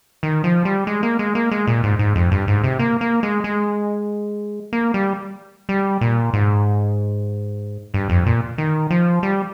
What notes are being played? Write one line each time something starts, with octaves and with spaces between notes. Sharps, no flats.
D#3
F3
G3
G#3
A#3
G#3
A#3
G#3
A#2
G#2
G#2
F2
G2
G#2
C3
A#3
A#3
G#3
G#3
A#3
G3
G3
A#2
G#2
G2
F2
A#2
D#3
F3
G3